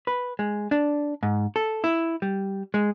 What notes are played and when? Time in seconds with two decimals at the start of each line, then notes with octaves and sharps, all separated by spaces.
0.07 B4
0.39 G#3
0.71 D4
1.23 G#2
1.56 A4
1.84 E4
2.22 G3
2.74 G#3